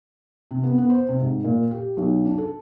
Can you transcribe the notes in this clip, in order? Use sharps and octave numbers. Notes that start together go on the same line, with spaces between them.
C3
B3
B3
C5
C3
G#2
A#2
G4
B1
D4
A4